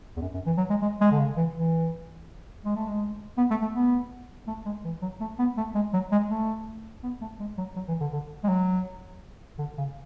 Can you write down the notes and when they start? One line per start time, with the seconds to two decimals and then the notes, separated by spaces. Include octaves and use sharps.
0.16 E2
0.21 F#2
0.34 F#2
0.46 E3
0.58 F#3
0.70 G#3
0.82 G#3
1.01 G#3
1.11 D3
1.19 C#3
1.37 E3
1.55 E3
2.65 G#3
2.76 A3
2.88 G#3
3.37 B3
3.51 A3
3.62 A3
3.74 B3
4.47 A3
4.66 G#3
4.85 E3
5.02 F#3
5.21 A3
5.39 B3
5.57 A3
5.75 G#3
5.93 F#3
6.12 G#3
6.30 A3
7.03 B3
7.21 A3
7.40 G#3
7.58 F#3
7.76 F#3
7.88 E3
8.01 D3
8.12 D3
8.44 G#3
8.49 F#3
9.58 D3
9.78 C#3